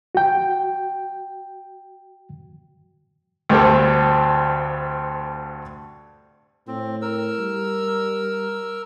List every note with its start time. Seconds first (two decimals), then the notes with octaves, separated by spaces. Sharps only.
0.15 F#4 G5
3.49 D2 G2 G3 C4 A4
6.67 A2 C4
7.02 A#4 E6
7.39 G3